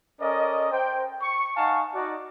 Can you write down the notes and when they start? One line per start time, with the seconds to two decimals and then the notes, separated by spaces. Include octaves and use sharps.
0.21 C#4 A4 A#4 D5 D#5
0.72 C5 G5
1.22 C#6
1.57 D#4 F5 F#5 G#5 A5 C#6
1.94 D#4 F#4 D5